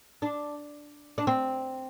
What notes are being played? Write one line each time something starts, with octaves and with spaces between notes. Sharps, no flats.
D4
D4
C4